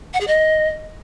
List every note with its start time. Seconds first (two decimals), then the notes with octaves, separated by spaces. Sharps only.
0.14 F#5
0.20 G#4
0.27 D#5